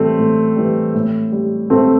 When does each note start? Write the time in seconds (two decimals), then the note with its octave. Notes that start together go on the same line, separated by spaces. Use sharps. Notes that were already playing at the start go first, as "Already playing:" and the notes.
Already playing: A2 E3 G3 A3 C4
0.18 A2
0.56 E3 G3
0.94 A2
1.32 G3
1.70 A2 A3 C4